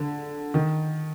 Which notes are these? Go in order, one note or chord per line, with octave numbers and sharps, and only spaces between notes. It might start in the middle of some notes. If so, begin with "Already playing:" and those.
Already playing: D3
D#3